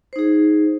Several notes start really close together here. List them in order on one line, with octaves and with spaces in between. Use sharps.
C5 D#4 G#4